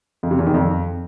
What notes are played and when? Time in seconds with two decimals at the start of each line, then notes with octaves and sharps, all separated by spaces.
0.23 F2
0.31 C3
0.39 E2
0.46 D#3
0.54 F2